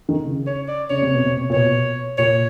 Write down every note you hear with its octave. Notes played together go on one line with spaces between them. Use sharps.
D#3
C#3
C#5
D5
C#3 C#5
C3
B2
C3
A#2
B2 C#5
A#2 C#5